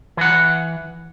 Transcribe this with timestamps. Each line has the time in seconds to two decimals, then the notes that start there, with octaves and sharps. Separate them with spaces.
0.17 E3 F#5